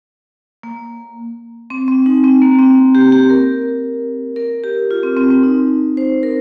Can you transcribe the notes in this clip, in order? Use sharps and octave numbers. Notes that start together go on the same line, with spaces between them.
A#3
C4
C4
D#4
C4
A#3
C4
G4
G4
A#4
A#4
G4
F4
C4
C4
C4
D#4
C5
A#4